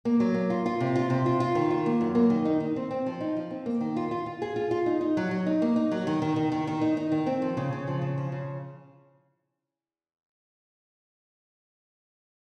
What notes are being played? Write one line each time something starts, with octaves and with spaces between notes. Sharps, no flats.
A#3
F#3
A#3
F4
F4
C3
F4
C3
F4
F4
D#3
F4
A#3
F#2
A#3
D#3
D#4
D#4
C4
C4
F3
D#4
F3
C4
A#3
D#3
F4
F4
F4
G#4
F4
F4
D#4
D#4
F#3
F#3
D#4
A#3
D#4
F#3
D#3
D#3
D#3
D#3
D#3
D#4
D#4
D#3
C4
F3
C#3
C#3
F3
C#3
F3
C#3